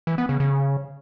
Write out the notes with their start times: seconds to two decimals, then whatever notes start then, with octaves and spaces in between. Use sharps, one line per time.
0.07 E3
0.18 B3
0.29 C#3
0.40 C#3